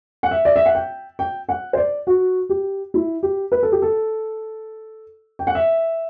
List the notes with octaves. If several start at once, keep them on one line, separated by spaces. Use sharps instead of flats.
F#5
E5
D5
E5
F#5
G5
G5
F#5
C5
D5
F#4
G4
E4
G4
B4
A4
G4
A4
G5
F#5
E5